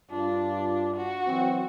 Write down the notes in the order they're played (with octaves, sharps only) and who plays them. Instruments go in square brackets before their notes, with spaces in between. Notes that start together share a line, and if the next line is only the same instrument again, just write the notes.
[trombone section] G2 F4 [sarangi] D4
[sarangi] F#4
[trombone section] E3 F#3 C4